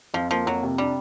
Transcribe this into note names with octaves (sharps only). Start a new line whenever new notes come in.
F2 F3
F3 A#3
F2 F#3
C3
G3 D4